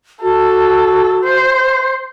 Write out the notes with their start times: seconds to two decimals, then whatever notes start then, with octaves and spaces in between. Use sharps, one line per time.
0.22 F#4 A4
1.24 C5